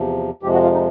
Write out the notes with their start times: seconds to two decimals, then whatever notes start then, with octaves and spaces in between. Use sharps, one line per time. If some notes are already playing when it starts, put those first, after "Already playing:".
Already playing: E2 C3 F3
0.43 F2 C3 F3 G#3 G4
0.53 F#4
0.63 F4
0.73 D#4